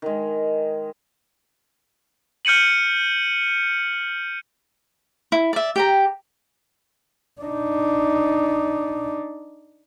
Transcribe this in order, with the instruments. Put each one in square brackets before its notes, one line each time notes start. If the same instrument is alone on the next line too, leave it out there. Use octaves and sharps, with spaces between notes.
[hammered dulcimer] D#3 G#3
[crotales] F6 G6 C#7 D#7 F#7
[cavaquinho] E4
D5 E5
G4 G5 A#5
[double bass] D4 D#4